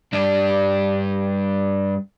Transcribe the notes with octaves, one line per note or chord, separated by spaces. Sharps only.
G2 D4